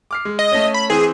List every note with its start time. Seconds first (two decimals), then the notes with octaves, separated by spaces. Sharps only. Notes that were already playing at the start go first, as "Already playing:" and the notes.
0.11 D6 F6 C7
0.25 G#3
0.39 D#5
0.52 A3 C#4
0.74 B5
0.90 E3 C4 G#4